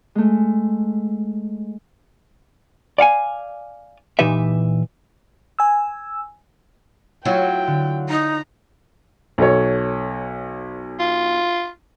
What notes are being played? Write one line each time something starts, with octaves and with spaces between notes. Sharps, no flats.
G#3 A3
D5 F5 F#5 G#5
A#2 E3 D#4 G4 B4 E5
G#5 E6
F#3 A3 E4 F4 G5
D3
D#4 A#5
B1 A4 C#5
F4